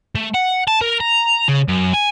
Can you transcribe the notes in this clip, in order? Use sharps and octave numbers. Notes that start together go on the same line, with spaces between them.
A3
F#5
A5
A#4
A#5
C#3
F#2
G#5